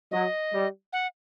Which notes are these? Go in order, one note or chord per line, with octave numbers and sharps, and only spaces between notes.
F#3 D#5
G3
F#5